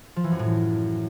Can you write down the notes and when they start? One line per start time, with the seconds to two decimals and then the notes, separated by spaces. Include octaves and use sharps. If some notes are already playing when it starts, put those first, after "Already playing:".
0.16 F3
0.24 E3
0.32 F#2
0.39 A2